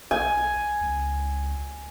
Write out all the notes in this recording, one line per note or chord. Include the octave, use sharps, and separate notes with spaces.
B1 G#5
C#2